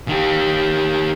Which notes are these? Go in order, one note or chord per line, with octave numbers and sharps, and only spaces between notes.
D#3 G4